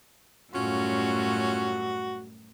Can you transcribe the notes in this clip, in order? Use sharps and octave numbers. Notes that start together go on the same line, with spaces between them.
F#2 A2 G3 C#4 F4 F#4